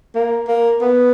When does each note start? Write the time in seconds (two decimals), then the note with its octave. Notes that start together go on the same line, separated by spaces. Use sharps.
0.15 A#3
0.48 A#3
0.82 B3